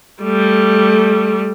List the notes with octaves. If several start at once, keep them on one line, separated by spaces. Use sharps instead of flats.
G3 A3